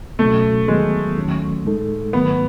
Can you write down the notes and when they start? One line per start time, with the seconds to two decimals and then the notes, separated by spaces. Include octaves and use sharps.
0.19 C#2 B2 F#3 A3 C#4 F#4
0.68 E2 D#3 F#3 G#3 B3
1.17 D#2 D#3 F#3 A3 C#4
1.65 A2 G#3 D#4 A4
2.13 G#2 D#3 F#3 A3 B3